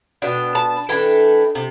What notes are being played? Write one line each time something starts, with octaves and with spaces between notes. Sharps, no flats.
B2 B3 D4 G5
A5
E3 A3 D4 G5
C3